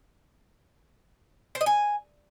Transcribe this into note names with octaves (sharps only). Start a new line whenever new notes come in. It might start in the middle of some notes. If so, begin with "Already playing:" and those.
C5
D#5
G#5